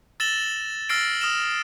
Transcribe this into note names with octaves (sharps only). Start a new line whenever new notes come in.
E6 A6 A#6 E7 F#7 G7
E6 F6 A6 A#6 C7 D7
D#6 F6 A#6 E7